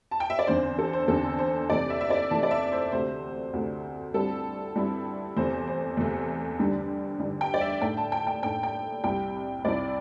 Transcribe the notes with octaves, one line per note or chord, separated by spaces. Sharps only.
A5
G5
E5
D5
E2 D3 C4 C5
A4
C5
E2 D3 C4 A4
C5
C3 E3 A3 D5
E5
E5
D5
C3 E3 A3 A5
D5
E5
C5
D2 C3 A3 C5
D2 C3 A3
G2 G3 C4 E4 A4
G2 G3 C4 E4
E2 C3 A3 C5
C5
E2 C3 A3
G2 D3 G3
G2 D3 G3
G5
D5
E5
A2 A3 D4 G5
A5
G5
G5
A2 A3 D4 G5
G5
C2 C3 G3 E4 G5
C2 C3 G3 E4 D5